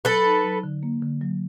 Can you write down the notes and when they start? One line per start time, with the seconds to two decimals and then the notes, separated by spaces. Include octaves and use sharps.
0.05 F#3 A4 B4
0.25 D#4
0.44 F#3
0.63 D3
0.83 A#3
1.02 D3
1.21 F#3